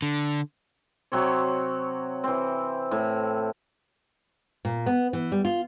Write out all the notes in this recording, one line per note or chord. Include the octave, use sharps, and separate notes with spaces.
D3
C3 F#3 C4 C#5
E3 C4
A2
A#2
B3
E3
G3
F4